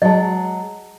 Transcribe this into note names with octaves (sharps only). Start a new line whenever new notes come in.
F#3 G#3 D#5 A5